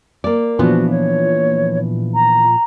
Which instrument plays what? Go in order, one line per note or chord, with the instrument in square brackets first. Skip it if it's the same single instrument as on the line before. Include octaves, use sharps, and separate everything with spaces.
[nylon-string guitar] A#3 D5
[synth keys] A#2 F3 [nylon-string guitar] E3 B3 D4 [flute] F#4
[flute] C#5
A#5